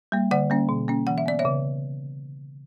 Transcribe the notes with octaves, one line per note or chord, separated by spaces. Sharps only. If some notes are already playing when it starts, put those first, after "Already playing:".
G3 A#3
D3 D5 F#5
G3 A#3 C#4
B2
A#3 C#4
E3 F#5
E5
B3 D5
C#5 E5
C#3